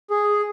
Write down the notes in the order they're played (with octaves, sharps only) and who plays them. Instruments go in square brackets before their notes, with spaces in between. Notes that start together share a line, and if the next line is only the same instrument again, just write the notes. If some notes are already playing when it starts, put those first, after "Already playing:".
[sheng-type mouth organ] G#4